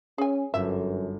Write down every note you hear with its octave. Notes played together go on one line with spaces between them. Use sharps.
C#4 G#4 G#5
G1 F#2 E5